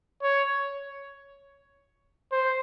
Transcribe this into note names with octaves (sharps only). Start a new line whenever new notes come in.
C#5
C5